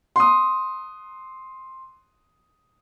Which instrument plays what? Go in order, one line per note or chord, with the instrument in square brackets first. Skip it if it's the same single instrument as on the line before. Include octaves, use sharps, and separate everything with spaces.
[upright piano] C6 D#6